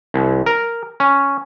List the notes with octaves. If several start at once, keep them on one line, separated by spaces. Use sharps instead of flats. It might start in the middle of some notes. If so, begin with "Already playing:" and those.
C2
A#4
C#4